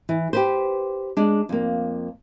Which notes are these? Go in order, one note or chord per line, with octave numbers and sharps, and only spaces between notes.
E3
G4 B4 C5
G#3 D4
F2 A#3